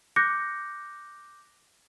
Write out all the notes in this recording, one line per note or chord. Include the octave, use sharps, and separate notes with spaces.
D6 F#6 G6 A#6 C#7